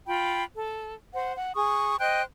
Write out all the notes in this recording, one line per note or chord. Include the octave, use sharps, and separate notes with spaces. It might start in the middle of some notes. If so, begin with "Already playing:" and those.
F4 G5 B5
A4
C5 F#5
F#5
G#4 C#6 D#6
C5 D#5 G5 F#6